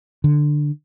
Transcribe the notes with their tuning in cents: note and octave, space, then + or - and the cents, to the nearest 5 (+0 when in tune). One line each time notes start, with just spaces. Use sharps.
D3 +10